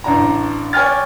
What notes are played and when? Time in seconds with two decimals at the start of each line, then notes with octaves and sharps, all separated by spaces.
0.04 A1 D4 A#5
0.73 C#5 D5 G5 G#5 F6 A6